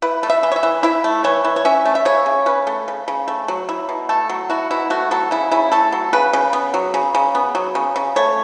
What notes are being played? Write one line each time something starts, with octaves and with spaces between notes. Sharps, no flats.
E4 B4
A3
E5
E3
C#5
E5
E3
E4 E5
A3
E3 C#5
E3
C#5
C#4 E5
A3
E5
C#3 C#5
C#3
C#4 B4
A3
C#3
C#3
A3
F#3
E4
B2
A3 A4
F#3
E4 F#4
B2 E4
A3 F#4
F#3 A4
C#3 E4
C#3 E4
A3 A4
F#3
C#3 B4
C#3
B3
F#3
C#3
C#3
B3
F#3
C#3
C#3
A3 C#5